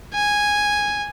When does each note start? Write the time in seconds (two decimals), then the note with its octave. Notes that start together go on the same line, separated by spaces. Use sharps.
0.15 G#5